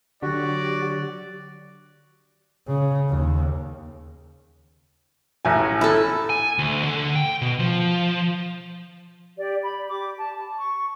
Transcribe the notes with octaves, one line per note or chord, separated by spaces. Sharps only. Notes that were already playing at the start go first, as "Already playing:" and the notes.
D3 F#3 F#4 G4 D5
C#3
D#2
A1 A2 G#5
E4 A4
G#5
D2
D3
G5
B2
F3
G4 D5
B5
G4 D6
A5
C#6